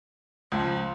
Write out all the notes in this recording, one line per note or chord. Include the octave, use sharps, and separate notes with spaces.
C#2 F3